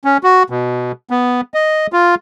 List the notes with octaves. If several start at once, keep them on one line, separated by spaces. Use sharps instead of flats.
C#4
F#4
B2
B3
D#5
F4